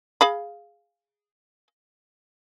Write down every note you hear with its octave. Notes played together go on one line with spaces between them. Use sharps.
G#4 F5 B5